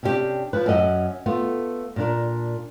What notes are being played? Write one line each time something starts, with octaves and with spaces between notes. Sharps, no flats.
C3 C#4 D4 E4 G4
F3 B4
F#2 C#4 F#4 D#5 E5 F#5
A3 B3 F4
A#2 D4 A#4